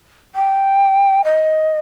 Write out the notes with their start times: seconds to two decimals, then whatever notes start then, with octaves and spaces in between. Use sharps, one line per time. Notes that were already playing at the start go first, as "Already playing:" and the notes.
0.35 G5
1.24 D#5